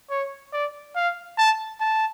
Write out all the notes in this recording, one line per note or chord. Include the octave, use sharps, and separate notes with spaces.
C#5
D5
F5
A5
A5